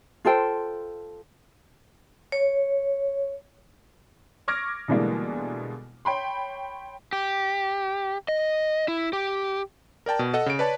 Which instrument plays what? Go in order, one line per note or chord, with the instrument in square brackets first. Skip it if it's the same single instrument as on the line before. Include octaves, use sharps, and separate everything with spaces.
[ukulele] F4 A4 C5 G5
[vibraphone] C#5
[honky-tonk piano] C#6 D6 F6 G#6 A#6 D7
B2 D3 E3 G3 G#3 A#3
C#5 G5 B5 C6
[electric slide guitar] G4
D#5
E4
G4
[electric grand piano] A#4 D5 G5 A5
B2
A4 D#5 F#5
C#3 D7
B4 C#5 D5 A5